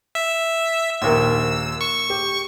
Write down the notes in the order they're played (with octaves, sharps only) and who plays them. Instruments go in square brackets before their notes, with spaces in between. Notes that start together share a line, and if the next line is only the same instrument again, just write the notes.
[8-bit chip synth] E5
[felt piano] A#1 D#2 A#3 [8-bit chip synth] E6
[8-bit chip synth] C#6
[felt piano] G4